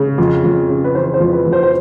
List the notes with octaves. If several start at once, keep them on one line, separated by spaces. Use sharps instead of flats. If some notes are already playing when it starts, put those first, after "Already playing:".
Already playing: C#3
F2
F2
C#3
B4
E3 C5
C5
F2
B4
F2
C5
C5